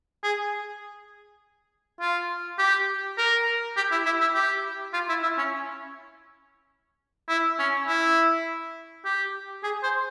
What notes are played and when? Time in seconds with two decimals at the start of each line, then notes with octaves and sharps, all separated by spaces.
0.24 G#4
2.01 F4
2.58 G4
3.18 A#4
3.77 G4
3.92 E4
4.06 E4
4.21 E4
4.35 G4
4.94 F4
5.09 E4
5.23 E4
5.38 C#4
7.29 E4
7.59 C#4
7.88 E4
9.05 G4
9.64 G#4
9.83 C5